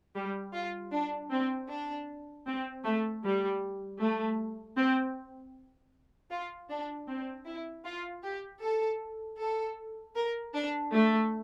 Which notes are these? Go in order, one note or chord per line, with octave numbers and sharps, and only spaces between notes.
G3
F4
D4
C4
D4
C4
A3
G3
A3
C4
F4
D4
C4
E4
F4
G4
A4
A4
A#4
D4
A3